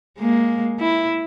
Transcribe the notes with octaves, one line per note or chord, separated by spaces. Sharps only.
G#3 A#3
E4